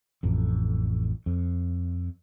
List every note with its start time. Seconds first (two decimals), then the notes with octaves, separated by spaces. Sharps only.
0.23 A1 F2
1.26 F2